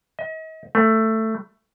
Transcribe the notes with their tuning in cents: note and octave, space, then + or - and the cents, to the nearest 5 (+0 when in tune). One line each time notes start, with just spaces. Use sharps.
D#5 +40
A3 +10